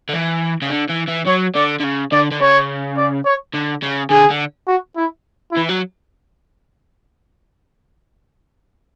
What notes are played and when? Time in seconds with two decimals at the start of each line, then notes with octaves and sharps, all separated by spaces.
0.09 D3
0.14 E3
0.62 C#3
0.70 D3
0.90 E3
1.08 E3
1.27 F#3 C#5
1.55 D3 D5
1.80 D3
1.84 C#3
2.12 D3 D5
2.31 D3
2.40 C#3 C#5
2.97 D5
3.25 C#5
3.54 D3
3.83 C#3
4.10 D3 G#4
4.30 D3
4.67 F#4
4.96 E4
5.52 E4
5.57 E3
5.69 F#3